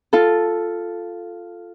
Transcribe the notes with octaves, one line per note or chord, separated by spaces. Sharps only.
F4 A4